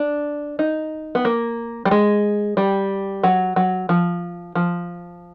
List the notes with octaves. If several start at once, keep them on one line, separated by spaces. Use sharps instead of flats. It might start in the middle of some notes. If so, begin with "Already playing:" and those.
Already playing: D4
D#4
B3
A#3
G3
G#3
G3
F#3
F#3
F3
F3